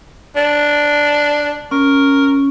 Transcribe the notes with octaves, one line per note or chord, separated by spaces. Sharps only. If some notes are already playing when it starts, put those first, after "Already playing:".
D4
C#4 A#4